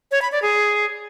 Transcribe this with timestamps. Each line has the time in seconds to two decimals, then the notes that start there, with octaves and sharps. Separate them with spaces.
0.11 C#5
0.22 B5
0.32 D5
0.42 G#4